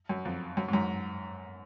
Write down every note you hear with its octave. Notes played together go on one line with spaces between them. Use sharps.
F#2
F2
F#2
G#2
F#2